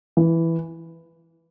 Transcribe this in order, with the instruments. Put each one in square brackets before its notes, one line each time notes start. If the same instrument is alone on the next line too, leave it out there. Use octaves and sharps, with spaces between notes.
[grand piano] E3